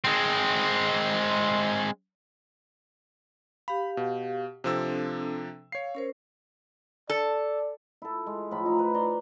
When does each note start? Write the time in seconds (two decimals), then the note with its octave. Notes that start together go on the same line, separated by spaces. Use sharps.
0.04 G#3 C4
3.68 G4 F5 B5
3.97 B2
4.64 C3 F3 C4 D4 A4 E6
5.72 C#5 F5 C7
5.95 C#4 A#4 C5
7.10 A4 D5
8.02 E4 A4
8.27 G#3
8.51 A2 F3 B5
8.66 D#4 F5
8.79 B4
8.94 D5 A#5 C6